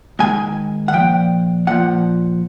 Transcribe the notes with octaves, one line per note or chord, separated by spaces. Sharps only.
G#2 D#3 G#5
F#5
A#2 F3 G5
A#2 F3 F#5